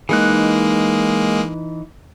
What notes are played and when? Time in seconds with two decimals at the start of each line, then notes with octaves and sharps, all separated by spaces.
0.09 E3 G#3 A#3 D#4 G#4 F#6